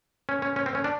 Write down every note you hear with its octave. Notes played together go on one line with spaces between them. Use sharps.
C#4
C#4
C#4
C4
C#4
D4